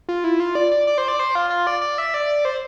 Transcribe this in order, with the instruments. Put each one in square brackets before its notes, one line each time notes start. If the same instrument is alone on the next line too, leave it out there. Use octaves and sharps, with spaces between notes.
[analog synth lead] F4
E4
F4
D5
D5
D5
C5
D5
C5
F4
F4
D5
D5
E5
D5
C5